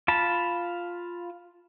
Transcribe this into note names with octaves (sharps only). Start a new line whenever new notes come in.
F4 A5 B5